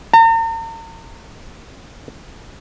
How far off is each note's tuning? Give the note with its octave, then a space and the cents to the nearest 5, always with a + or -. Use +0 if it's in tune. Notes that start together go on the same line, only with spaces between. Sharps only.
A#5 -45